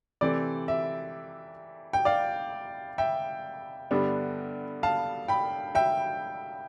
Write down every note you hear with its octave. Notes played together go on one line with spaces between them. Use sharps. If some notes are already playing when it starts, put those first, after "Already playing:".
C3 E3 A3 C4 D5
E5
G5
D5 F5
E5 G5
G2 D3 G3 B3 D4
F5 A5
G5 B5
E5 G5